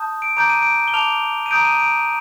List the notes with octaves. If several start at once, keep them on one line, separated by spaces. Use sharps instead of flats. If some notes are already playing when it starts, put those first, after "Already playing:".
Already playing: A5 D#6 G6
D7
A#5 D6 G6 D7
D#7
D7
G7
A5 D6 F6 F7
D#7
A#5 D#6 G6 D7
D#7
D7